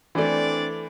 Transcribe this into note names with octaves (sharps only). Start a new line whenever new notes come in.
E3 A3 C4 D4 D5